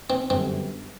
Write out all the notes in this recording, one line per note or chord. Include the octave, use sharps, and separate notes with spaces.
C4
G1 F#2 D3 G3 B3 C4